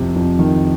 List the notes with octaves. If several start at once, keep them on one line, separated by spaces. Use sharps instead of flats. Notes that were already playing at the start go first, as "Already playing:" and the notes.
Already playing: F2 C3
F2
D#3